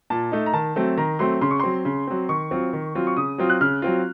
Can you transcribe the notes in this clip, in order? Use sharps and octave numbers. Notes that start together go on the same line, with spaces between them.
A#2 A5
A3 D#4
A#5
D#3 A5
F#3 A3 C4
D#3 A#5
F#3 A3 C4 C6
C#3 C6
C#6
F#3 C4 C6
C#3
F#3 C4
D#3 C#6
F#3 C4 F4
D#3
F#3 C4 F4
C#6
C#3 D#6
F#3 C4 F4
F#6
C#3 F6
F#3 C4 F4